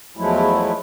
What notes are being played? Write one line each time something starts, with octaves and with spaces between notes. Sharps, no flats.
E2 F3 F#3 G#3 A3 E4